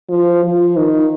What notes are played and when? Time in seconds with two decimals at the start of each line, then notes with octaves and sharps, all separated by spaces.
0.09 F3
0.43 F3
0.76 D#3